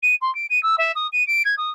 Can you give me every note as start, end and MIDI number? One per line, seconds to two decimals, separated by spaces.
0.02 0.15 99
0.21 0.33 84
0.35 0.46 98
0.49 0.61 99
0.63 0.75 88
0.78 0.92 76
0.95 1.07 87
1.12 1.25 99
1.27 1.42 98
1.45 1.55 92
1.57 1.70 87